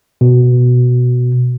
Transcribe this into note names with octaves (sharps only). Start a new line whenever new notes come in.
B2